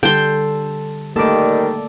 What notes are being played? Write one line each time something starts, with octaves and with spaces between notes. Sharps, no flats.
D3 G3 A4 G5 C6
D#3 G3 A3 A#3 A4 D5